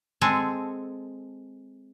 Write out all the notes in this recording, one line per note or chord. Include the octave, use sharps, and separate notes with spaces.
G#3 C4 G#4 A4